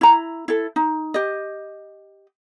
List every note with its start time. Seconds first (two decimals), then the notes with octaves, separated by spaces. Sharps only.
0.01 E4 A#5
0.48 E4 A4
0.76 D#4
1.14 G4 D#5